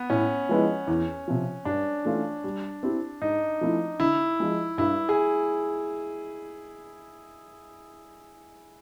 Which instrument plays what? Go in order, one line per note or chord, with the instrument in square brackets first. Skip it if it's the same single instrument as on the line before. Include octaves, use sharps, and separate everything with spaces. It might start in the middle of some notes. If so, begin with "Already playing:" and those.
Already playing: [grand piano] B3
[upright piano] A2 [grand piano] C#4
[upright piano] F3 G#3 B3 E4
E2
C3 F3
[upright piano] G2 [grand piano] D4
[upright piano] E3 A3 C#4 F4
G3
C4 E4 G4
[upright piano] G#2 [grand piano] D#4
[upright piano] F3 A3 C4 E4
[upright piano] D3 [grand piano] E4
[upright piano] F3 G#3
[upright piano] G2 [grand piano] E4
[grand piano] G#4